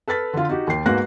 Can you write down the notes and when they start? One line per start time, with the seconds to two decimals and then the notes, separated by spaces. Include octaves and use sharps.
0.08 A4 B4 F6 A6 B6
0.33 D3 F4
0.49 D#4 F#4 G4
0.67 D#2 G5 C7
0.86 G#2 A#3 B3 F#4 F#6 A#6